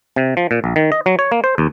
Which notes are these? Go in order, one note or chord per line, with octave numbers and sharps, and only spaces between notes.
C3
F3
A#2
A#1
D#3
D#5
F#3
C#5
A#3
C5
D#2